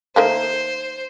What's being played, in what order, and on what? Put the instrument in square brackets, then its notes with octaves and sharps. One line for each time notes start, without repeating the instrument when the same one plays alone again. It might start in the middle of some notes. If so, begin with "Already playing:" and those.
[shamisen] D#3 A3 A#3 [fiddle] C5